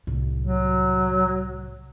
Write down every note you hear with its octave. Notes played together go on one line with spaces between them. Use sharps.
C2 A2
F#3